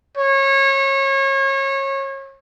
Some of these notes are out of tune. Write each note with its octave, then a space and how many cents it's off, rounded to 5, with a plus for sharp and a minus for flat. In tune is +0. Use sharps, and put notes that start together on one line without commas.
C#5 -30